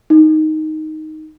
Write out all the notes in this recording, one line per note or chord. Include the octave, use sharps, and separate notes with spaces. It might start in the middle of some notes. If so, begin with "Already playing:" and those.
D#4